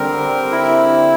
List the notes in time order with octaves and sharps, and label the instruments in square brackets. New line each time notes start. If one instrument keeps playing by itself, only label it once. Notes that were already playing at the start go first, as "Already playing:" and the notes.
Already playing: [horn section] D3 G3 C4 [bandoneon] A#4
[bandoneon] E4